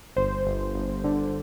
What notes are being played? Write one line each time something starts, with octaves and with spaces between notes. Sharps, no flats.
G1 C5
G1
G1
D3